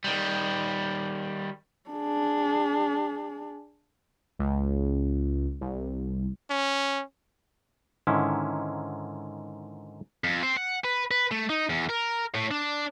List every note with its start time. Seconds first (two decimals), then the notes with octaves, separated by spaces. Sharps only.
0.04 D#3 G3
1.90 D4 G#4
4.39 C#2
5.61 C2
6.50 C#4
8.07 G#2 D3 D#3 C#4 E4
10.24 F2
10.43 C4
10.57 F#5
10.84 B4
11.11 B4
11.31 A3
11.50 D#4
11.69 E2
11.89 A#4
12.35 A2
12.51 D4